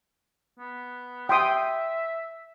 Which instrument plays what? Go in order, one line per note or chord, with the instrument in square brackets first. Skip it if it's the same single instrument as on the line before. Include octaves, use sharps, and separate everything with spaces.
[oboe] B3
[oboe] E5 [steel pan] G5 C6 D#6